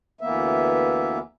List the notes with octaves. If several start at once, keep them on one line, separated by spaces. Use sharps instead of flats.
D2 E3 A#3 B3 E5